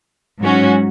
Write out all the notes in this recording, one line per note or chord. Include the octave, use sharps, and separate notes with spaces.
G#2 F#3 C#4 F#4